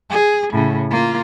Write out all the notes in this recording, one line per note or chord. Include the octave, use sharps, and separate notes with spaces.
G#4
A2 C#3
A#3 F4